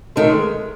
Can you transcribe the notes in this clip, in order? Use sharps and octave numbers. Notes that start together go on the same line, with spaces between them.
D#3 A3
G#3